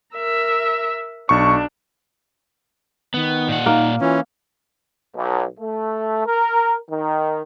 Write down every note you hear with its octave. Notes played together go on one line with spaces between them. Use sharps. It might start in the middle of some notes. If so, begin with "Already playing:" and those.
A#4 E5
B1 D4 C#6
D#3 B3
A#2 F#5
A#3 D#4
E3 C#4 F4
B1
A3
A#4
D#3